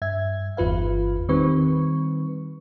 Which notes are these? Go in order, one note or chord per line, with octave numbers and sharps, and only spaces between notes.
G2 E5 G#6
G1 E2 F4 B4 F5
D#3 G3 C4 B4 C#6